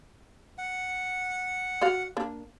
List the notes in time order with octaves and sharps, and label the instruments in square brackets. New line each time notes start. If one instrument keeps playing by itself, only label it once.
[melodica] F#5
[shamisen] F#4 D5 F5
A#3 D4